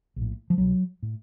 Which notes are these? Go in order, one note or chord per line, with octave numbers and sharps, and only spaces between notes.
A#1
A2
F3
C2 B2 F#3
A2